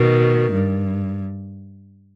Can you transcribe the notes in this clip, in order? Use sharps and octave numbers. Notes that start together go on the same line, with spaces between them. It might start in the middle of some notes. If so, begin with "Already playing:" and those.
Already playing: B2 D#3
G2